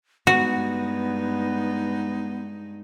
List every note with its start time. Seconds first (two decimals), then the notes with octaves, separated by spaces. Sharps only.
0.27 G2 G#3 B3 D#4 F#4